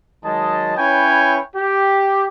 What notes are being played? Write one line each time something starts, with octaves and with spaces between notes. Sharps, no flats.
D#3 F#3 G#3 D#5 A5
C#4 E4 B4 C#5 G5 G#5
G4